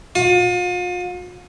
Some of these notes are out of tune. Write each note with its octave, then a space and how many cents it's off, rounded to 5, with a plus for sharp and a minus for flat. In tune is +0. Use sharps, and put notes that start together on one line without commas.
F4 +40